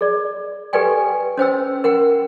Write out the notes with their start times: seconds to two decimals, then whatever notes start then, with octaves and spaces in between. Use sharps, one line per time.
0.01 G#4 D5
0.73 G4 A4 B4 D5 G5 G#5
1.38 C#4 C5 G5 E6
1.84 A#4 F#5 G5